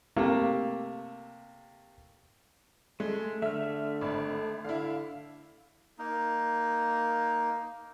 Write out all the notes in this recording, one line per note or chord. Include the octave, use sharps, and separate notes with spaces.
C3 A3 A#3 A4
G#3 A3
D3 A3 E5 F6
G#1 B5
D3 E4 F5
A#3 D#4